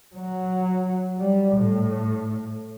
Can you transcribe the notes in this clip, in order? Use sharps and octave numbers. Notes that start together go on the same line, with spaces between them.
F#3
G3
A2